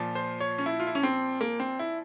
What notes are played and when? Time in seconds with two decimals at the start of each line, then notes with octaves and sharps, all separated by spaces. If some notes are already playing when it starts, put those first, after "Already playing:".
Already playing: A#2 F3
0.15 C5
0.40 C#5
0.58 C#4
0.66 E4
0.80 F4
0.87 E4
0.95 C#4
1.03 C4
1.41 A#3
1.60 C4
1.79 E4